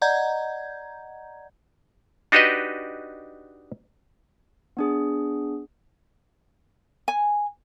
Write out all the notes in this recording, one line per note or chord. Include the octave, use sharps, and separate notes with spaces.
D5 D#5 F#5 A#5 G6 G#6
D4 D#4 F#4 G4 B4 D#5
B3 D4 G#4
G#5